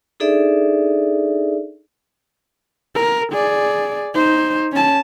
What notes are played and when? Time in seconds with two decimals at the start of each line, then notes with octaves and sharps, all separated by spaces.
0.20 D4 D#4 G#4 A4 D5 E5
2.95 A#4
3.33 G#4 D5
4.15 D#4 C5
4.72 C#4 A5